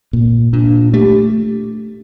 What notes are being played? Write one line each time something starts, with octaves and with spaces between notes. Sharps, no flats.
A#2
A#2 D4
A3 G4